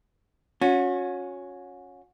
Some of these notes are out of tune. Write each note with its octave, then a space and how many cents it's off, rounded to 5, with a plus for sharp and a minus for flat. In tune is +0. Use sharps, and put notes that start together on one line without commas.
C#4 +0 F#4 -35